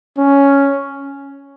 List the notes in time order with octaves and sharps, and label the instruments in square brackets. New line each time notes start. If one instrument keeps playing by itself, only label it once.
[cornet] C#4